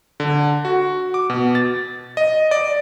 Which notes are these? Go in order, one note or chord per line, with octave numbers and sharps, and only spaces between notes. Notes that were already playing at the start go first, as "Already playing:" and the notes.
D3
F#4
D6
B2
A6
D#5
D5